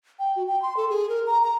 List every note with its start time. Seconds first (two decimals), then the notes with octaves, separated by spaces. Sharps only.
0.19 G5
0.36 F#4
0.48 G5
0.62 C6
0.77 A4
0.90 G#4
1.09 A#4
1.26 A#5
1.44 A#5